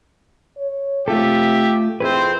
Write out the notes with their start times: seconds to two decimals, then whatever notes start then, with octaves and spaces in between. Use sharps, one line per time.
0.57 C#5
1.08 C3 A3 F4 G4 A4 E5
2.00 F2 C4 E4 G#4 B4 C5